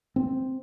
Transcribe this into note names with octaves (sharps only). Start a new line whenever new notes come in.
C4